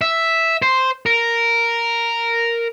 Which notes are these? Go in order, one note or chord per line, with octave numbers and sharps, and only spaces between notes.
E5
C5
A#4